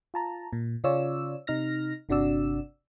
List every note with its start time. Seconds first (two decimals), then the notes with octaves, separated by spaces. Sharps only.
0.14 F4 A5 A#5
0.53 A#2
0.84 C#3 C#4 F4 C#5 D5 E6
1.47 C3 D#4 F6 A#6
2.09 G1 C3 D4 F#4 D5 E6